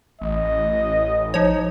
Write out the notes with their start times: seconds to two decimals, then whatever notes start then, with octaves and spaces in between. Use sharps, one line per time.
0.21 A1 D#5
1.34 F3 D#4 C#5